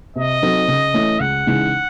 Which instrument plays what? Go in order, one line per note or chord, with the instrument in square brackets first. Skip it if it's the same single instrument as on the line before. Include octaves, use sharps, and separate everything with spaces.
[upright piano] C3 [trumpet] D#5
[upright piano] F#3 C4 D#4 A4
C#3
E3 A3 C#4
[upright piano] C#2 [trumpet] F#5
[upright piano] C#3 E3 G#3 D#4